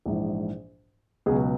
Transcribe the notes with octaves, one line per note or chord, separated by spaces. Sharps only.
A#1 G#2 E3
C#2 B2 F#3 G#4